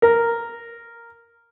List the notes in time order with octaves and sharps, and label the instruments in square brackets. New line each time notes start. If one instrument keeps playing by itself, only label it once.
[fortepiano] A#4